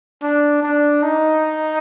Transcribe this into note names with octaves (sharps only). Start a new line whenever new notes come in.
D4
D4
D#4